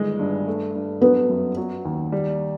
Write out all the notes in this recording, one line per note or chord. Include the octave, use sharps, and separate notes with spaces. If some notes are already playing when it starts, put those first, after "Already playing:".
Already playing: G1 D#3 G#3
G2
A3
G2
F#3 B3
F#2
F#3
D#2
G3